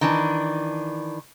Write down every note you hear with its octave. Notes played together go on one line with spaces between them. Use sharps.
D#3 E3 D4